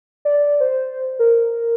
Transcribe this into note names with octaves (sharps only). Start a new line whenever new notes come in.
D5
C5
A#4